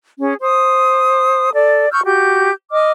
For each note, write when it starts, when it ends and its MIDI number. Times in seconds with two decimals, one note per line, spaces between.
0.20 0.33 61
0.20 0.33 68
0.40 1.50 72
0.40 1.50 87
1.54 1.88 69
1.54 1.88 74
1.91 2.00 85
1.91 2.00 88
1.91 2.00 89
1.91 2.00 91
2.05 2.50 66
2.05 2.50 67
2.05 2.50 91
2.71 2.92 75
2.71 2.92 86
2.71 2.92 89